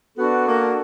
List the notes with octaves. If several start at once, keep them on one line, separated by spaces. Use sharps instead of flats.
B3 D4 F#4 A4
A#3